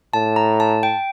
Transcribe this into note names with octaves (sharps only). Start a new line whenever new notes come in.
A2 A5
A#5
A5
G5